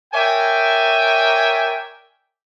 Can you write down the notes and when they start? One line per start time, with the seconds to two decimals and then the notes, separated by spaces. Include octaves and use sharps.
0.13 A#4 C#5 D5 E5 G5 G#5